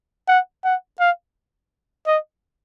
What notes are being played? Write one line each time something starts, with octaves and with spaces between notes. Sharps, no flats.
F#5
F#5
F5
D#5